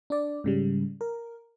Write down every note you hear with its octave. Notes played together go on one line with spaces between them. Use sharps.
D4 D5
G#2 C#3 G3
A#4